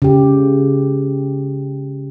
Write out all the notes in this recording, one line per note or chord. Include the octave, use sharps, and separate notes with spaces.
C#3 G4